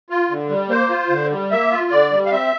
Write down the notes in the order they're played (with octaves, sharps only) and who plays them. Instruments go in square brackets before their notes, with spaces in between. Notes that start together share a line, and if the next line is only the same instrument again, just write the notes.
[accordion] F4
D3
G3
A#3 C5
F4
D3
G3
A#3 E5
F4
D3 D5
G3
F5
C4 E5